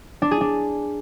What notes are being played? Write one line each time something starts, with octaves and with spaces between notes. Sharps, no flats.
D4
G#4
D4